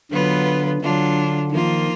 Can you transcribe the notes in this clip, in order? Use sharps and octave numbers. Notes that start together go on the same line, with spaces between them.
D3 F#3 B3 F4 B4
D3 F#3 D4 F4
D#3 F3 A#3 F4